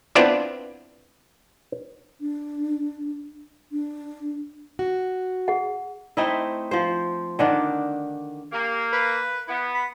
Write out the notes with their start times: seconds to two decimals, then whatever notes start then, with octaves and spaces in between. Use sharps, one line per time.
0.15 B3 C4 D4 E4 F4 D5
2.21 D4
3.72 D4
4.79 F#4
5.48 G#4 F#5
6.17 A3 C4 D#4 E4
6.71 F3 C5
7.39 D3 D#3 D4
8.52 A#3 G4
8.93 B4
9.48 B3 E4
9.75 B5